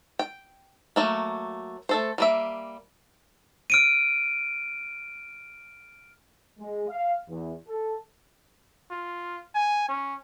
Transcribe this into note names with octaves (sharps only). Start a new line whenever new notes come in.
G5
F#3 A3 A#3
A3 A4 C5
G3 A#3 E5
F6 D7 D#7
G#3
F5
E2
A4
F4
G#5
C#4